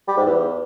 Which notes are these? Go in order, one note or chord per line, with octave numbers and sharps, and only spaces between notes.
G3
G#2
E2